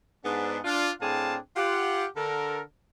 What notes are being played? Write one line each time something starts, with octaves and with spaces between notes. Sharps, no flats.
G#2 B3 D4
D4 F4
A2 C4 D4 G#4 F5 A5
F4 G4 F#5
D3 A4 A#4